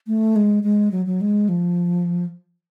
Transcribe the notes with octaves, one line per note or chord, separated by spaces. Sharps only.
A3
G#3
G#3
F#3
F#3
G#3
F3